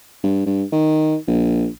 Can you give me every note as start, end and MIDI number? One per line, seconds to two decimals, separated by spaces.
0.23 0.42 43
0.46 0.63 43
0.72 1.16 51
1.27 1.67 34